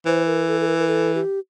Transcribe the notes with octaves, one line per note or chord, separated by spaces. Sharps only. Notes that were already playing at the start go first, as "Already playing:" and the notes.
E3 C5
A#4
A4
A4
A#4
A#4
A4
G4